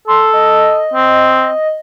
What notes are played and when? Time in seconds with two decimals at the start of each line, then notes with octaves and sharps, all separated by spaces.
0.08 A4 C6
0.34 D#5
0.94 C4